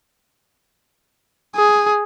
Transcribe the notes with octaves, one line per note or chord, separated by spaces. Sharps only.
G#4